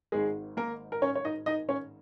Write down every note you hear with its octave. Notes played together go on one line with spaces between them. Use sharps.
G#1 G#2 D#3 G#3 G#4
A#3 A#4
A#4
C#4 C#5
C#5
D#4 D#5
D#4 D#5
C#4 C#5